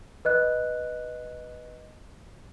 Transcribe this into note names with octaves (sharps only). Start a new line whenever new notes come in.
B4 D#5 F#6